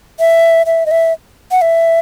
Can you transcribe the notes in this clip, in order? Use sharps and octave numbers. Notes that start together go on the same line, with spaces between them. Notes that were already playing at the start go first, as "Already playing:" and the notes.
E5
E5
D#5
E5
F#5
E5